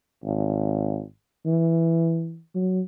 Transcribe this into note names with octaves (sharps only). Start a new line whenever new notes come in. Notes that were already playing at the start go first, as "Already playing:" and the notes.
G#1
E3
F#3